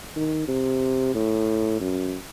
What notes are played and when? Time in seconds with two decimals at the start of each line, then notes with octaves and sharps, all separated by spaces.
0.16 D#3
0.48 C3
1.15 A2
1.80 F#2